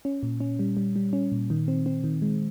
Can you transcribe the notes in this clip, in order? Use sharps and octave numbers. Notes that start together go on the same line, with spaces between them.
C#4
A#2
C#4
G3
G3
G3
C#4
A#2
D#3
C4
C4
D#3
G#3